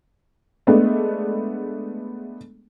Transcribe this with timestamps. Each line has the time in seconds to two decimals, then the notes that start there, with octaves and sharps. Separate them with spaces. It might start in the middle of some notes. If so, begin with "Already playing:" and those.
0.67 G#3 A3 B3 D4